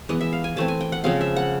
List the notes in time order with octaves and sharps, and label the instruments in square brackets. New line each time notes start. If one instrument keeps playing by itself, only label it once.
[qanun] E3 G#3 B3 D#5
E5
F5
G#5
E3 A3 C4 A5
G#5
G5
F#5
C#3 F3 G#3 C4 F5
E5
F#5